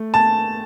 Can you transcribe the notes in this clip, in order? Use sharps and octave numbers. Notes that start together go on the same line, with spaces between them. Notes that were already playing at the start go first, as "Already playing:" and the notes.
Already playing: A3
A5